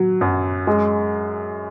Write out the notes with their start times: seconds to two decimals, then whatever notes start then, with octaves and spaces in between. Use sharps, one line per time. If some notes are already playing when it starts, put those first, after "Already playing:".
Already playing: F#3
0.21 F#2
0.67 G#3